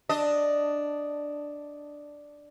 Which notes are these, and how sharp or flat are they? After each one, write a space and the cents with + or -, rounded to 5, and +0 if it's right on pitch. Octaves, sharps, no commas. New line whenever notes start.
D4 +0 D#5 +0